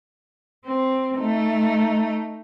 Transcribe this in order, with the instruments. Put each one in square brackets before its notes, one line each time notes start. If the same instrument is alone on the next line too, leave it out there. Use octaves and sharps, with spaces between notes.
[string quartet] C4
A3 D#4